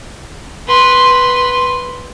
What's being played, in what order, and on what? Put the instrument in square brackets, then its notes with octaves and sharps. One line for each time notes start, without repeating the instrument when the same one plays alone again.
[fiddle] B4 C6